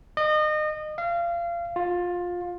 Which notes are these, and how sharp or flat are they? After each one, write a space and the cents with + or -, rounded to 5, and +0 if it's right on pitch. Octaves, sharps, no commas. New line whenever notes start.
D#5 -30
F5 -25
F4 +20